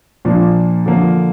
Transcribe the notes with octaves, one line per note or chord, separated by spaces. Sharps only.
A#2 F3 A#3 D4
D3 F3 A#3